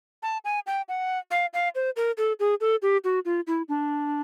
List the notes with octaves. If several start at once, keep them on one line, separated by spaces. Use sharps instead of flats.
A5
G#5
G5
F#5
F5
F5
C5
A#4
A4
G#4
A4
G4
F#4
F4
E4
D4